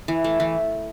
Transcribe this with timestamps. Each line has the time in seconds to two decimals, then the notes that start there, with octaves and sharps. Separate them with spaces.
0.08 E3
0.24 A3
0.40 E3